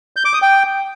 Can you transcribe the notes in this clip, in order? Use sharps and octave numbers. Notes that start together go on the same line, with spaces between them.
G6
D6
D#6
G5